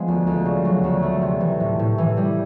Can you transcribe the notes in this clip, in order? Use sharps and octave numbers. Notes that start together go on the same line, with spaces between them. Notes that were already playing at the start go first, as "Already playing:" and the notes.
Already playing: F3 G#3 B3
D2
D2
C#3
F#3
D2
A3
C3
E3
A2
A2
E3
G3